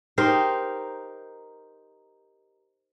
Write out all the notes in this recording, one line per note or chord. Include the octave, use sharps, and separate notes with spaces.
D#4 G4 A#4 C5